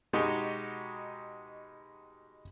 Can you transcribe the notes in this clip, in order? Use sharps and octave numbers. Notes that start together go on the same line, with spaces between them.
B2 G#3 D#4 F#4 G4